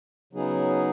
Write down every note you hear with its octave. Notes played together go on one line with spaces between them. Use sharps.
C#3 F#3 B3 D#4 G#4